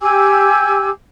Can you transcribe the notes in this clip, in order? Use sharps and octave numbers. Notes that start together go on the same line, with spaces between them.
G4 G#5 D6 E6